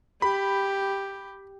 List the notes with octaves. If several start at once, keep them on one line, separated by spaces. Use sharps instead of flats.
G4 B5